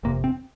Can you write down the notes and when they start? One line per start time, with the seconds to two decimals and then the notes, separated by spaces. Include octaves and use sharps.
0.03 G1 F2 C3 A#3
0.24 C4